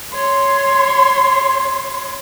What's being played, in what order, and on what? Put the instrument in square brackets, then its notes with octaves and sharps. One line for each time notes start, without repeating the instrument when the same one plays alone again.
[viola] C#5 C6